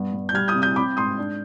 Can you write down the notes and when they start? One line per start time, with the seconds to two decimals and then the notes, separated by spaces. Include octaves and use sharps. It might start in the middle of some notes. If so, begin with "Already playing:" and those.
Already playing: G2 B3
0.13 G2
0.29 G6
0.34 G3 F6 G#6
0.48 D#6 G6
0.55 C3
0.62 D#6 G6
0.76 C4 B5 D6
0.97 G#2 C6 D#6
1.18 D4